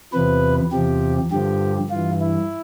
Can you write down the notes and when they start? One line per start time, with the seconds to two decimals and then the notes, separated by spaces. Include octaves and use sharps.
0.13 E2 C3 F3 B4
0.72 E2 C3 F3 G4
1.31 G2 D3 F3 G4
1.90 G2 E3 F4
2.20 E4